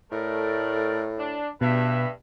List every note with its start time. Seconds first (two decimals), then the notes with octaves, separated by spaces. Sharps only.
0.12 A2 A3 A#4 D5
1.18 D4
1.61 G2 B2 B4 E5